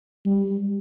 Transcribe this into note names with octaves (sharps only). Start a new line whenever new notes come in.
G3